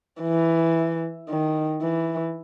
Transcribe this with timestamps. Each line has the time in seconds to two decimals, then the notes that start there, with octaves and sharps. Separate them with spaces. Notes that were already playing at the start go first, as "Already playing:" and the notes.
0.21 E3
1.29 D#3
1.81 E3